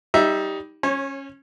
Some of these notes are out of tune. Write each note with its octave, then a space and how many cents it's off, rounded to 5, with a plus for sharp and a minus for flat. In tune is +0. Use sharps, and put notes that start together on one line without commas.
G3 +0 D#4 +15 E5 +0
C#4 -10 C#5 -35